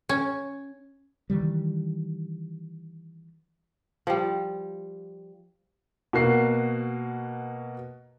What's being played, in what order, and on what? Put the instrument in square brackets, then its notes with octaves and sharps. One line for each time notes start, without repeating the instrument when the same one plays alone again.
[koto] C#4
[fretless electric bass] D#3 E3 G3
[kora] F3 G3
[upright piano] B2 A#3 F#4 C7